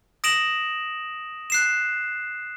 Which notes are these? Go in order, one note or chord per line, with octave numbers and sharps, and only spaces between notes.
D#6 A#6 D7 E7 F#7
F#6 C7 E7